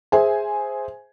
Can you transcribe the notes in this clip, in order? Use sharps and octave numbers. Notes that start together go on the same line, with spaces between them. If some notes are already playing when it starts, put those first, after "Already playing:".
G#4 C5 E5 G#5